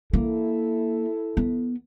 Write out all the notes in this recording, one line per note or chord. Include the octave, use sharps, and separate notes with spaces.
A#3 E4 A4
B3